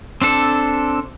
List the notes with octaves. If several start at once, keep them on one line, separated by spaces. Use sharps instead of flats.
C4 D4 A4